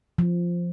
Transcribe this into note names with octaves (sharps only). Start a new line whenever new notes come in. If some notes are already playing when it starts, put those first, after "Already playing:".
F3